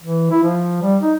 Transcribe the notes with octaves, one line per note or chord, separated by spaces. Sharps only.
E3
E4
F3
G3
D#4